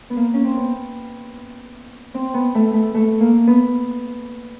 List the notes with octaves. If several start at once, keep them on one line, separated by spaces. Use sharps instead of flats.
B3
A#3
C#4
C4
B3
C4
B3
A3
A3
A3
A#3
B3